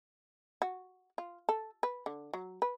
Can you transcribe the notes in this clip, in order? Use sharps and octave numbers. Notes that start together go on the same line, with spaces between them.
F#4
F4
A4
B4
D3
F#3
B4